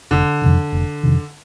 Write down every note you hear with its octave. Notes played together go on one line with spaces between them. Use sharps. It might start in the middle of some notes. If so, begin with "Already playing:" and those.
F1 D3
F2 C3 D#3
F1
F2 C3 D#3